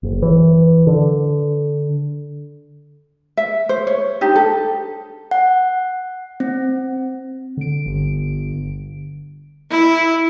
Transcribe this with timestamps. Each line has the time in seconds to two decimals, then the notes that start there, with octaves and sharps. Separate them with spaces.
0.03 F#1
0.22 E3
0.87 D3
3.37 E5
3.69 C5
3.87 C#5
4.21 D4 D#4 G4
4.35 A4
5.31 F#5
6.40 C4
7.57 D3 D7
7.86 G1
9.71 E4